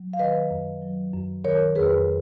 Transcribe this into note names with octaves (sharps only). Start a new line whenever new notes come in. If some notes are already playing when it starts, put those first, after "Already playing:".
Already playing: F#3
F5
D#3 B4 D#5
F#2
F#3
F#2
D#3 A#4 C#5
F2 G#4 B4